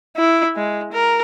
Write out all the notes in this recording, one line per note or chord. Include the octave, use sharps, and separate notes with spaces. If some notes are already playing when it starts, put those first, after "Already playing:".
E4
G#3
A#4